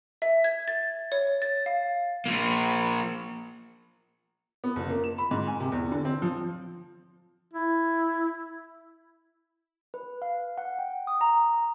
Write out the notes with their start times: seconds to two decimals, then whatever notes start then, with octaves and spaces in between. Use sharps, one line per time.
0.22 E5
0.44 G#6
0.68 A6
1.12 C#5
1.42 A6
1.66 F5
2.26 F3 A#3
4.64 B3
4.76 F#1
4.90 A#3
5.04 E7
5.18 B5
5.31 G#2
5.47 G#5
5.60 C3
5.72 E2
5.92 D3
6.05 C4
6.22 F3
7.53 E4
9.94 B4
10.22 F5
10.58 F#5
10.79 G5
11.07 D#6
11.21 A#5